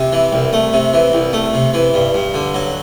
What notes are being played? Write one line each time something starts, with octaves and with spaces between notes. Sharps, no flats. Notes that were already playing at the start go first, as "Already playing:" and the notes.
Already playing: C3
E3
C2
A3
C3
E3
C2
A3
C3
E3
G2
G2
D3
F#3